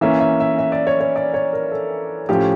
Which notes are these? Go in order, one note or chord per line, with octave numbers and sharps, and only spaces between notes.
E3 A#3 C#4 E5
E5
E5
E5
D5
C#5
C#5
D5
C#5
A#4
A4
A2 F3 C#4 G4